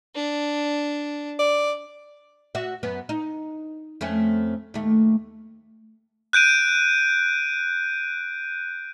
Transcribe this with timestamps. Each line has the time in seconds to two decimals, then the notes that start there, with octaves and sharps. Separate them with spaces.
0.15 D4
1.39 D5
2.55 F#4 E5
2.83 F#2 B3
3.09 D#4
4.01 F2 A3 C#4
4.74 D#2 A3
6.33 F#6 G6 D7 D#7